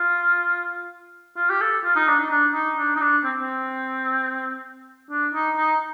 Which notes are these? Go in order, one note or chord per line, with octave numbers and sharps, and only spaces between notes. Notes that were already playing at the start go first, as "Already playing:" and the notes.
Already playing: F4
F4
G4
A4
F4
D#4
D4
D#4
D4
D#4
D4
D#4
D4
C4
C4
D4
D#4
D#4